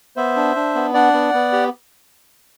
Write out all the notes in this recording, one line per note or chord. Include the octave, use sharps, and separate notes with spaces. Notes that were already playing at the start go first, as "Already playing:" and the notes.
B3 C5 E5
D4
D4
B3
D4 D5 F#5
B3
B3
G4